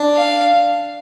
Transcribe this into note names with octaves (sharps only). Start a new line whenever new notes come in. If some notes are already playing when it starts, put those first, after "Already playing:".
Already playing: D4
F5